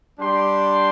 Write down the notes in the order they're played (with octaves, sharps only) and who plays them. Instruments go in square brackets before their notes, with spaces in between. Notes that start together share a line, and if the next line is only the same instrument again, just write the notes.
[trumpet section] G3 D4 G4 C6